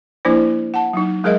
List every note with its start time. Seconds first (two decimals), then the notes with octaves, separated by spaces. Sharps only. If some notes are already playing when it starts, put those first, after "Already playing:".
0.25 F3 A#3 D4 E4 C5
0.74 F#5 A5
0.93 F#3 D#4
1.23 F#3 G#3 G#4 A#4 D#5 E5